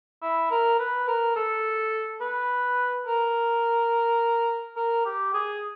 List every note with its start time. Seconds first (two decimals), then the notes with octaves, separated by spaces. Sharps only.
0.22 E4
0.51 A#4
0.79 B4
1.08 A#4
1.36 A4
2.21 B4
3.07 A#4
4.76 A#4
5.05 G4
5.34 G#4